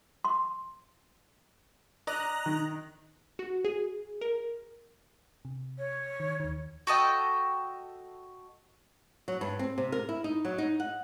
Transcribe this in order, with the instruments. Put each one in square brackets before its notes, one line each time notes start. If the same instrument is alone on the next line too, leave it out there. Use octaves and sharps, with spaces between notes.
[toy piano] C6
[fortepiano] D5 [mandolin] D#5 [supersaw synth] A#5 F#6
[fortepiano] D#3
[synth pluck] F#4
G#4
A#4
C3
[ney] C#5
[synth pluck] D#3
D#2 D#3
[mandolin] F#4 A4 D#5 G5
[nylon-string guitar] F#3
G2
C4
C3
A#4
E4
D#4
F#3
D#4
F#5